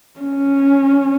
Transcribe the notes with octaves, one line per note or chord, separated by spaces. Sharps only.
C#4